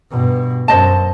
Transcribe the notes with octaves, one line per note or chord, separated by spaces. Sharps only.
G2 B2
F#2 C5 D#5 A5